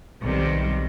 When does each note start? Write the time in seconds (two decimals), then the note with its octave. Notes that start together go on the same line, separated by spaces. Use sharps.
0.23 B1 C3 D#3 G3